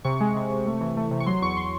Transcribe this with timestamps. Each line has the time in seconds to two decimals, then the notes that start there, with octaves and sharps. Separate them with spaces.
0.05 C3 C#6
0.21 G#3
0.36 C3
0.51 C3
0.66 A3
0.81 E3
0.97 A3
1.11 C3
1.20 C#6
1.26 F#3 C6
1.42 E2 C#6
1.57 C6